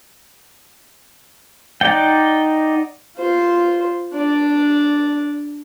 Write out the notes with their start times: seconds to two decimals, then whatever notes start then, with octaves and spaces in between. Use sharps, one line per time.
1.81 D#4 D5 F#5 G5
3.17 F4 C5
4.13 D4 D5